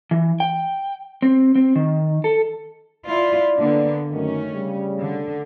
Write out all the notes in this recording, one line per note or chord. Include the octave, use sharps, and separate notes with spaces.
E3
G5
C4
C4
D#3
A4
E4 F4 D5
D3 A#3 B3
F#2 D#3 A3 C#4
C#3 G3
D3